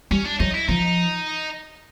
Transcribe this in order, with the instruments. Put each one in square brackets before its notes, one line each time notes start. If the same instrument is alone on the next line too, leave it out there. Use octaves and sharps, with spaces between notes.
[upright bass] G3 [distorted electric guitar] C#4
[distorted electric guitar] D4
[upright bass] F#3 [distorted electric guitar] D#4
[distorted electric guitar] E4
[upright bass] F3 [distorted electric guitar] D#4